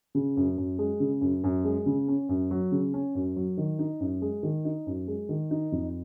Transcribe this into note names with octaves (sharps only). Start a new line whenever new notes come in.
C#3
F#2
F#2
G#3
C#3
F#2
F#2
G#3
C#3
C#4
F#2
F#3
C#3
C#4
F#2
F#3
D#3
D#4
F#2
G#3
D#3
D#4
F#2
G#3
D#3
D#4
F2